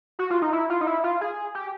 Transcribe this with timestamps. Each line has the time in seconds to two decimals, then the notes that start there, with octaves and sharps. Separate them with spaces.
0.19 F#4
0.30 F4
0.42 D#4
0.53 E4
0.70 F4
0.81 D#4
0.87 E4
1.04 F4
1.21 G#4
1.55 G4